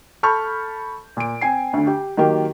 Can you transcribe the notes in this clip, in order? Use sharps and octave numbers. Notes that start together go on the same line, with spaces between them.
A4 A5 B5 C#6 F6 G6
A#2 D7
C4 G#5 C7
D2 D3
G4
D#3 F#3 A#3 G4